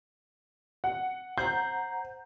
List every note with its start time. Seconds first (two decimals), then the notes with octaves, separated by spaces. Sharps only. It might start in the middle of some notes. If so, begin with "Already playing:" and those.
0.84 F#5
1.38 C5 F#5 A#5 G6